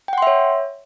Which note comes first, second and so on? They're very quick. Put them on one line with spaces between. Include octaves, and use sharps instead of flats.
G5 F#5 C6 E5 C#5